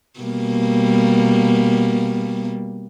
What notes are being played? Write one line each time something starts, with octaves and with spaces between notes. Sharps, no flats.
B2 G3 A#3